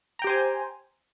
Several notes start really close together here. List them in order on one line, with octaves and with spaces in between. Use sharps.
A#5 G5 G4 C5 G#5